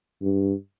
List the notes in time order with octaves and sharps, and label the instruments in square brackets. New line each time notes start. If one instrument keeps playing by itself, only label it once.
[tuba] G2